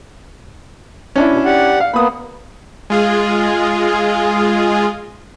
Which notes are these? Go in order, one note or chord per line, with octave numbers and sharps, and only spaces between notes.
C#4 D4 E4
B2
G4 D5 F#5
F5
A#3 B3 B5 D#6
G#3 F4 G#4